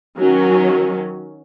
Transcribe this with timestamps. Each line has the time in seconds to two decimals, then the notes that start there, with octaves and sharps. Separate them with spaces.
0.18 D#3 F#3 C#4